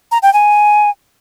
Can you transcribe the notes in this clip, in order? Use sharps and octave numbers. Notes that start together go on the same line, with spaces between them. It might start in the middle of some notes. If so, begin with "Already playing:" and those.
A#5
G5
G#5